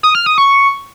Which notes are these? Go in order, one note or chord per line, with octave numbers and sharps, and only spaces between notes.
D#6
F6
D#6
C#6